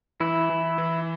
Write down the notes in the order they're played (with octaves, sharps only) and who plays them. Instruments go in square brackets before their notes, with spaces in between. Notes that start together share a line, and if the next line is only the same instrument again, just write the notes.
[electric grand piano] E3 [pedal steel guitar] E4
[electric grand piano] E3
E3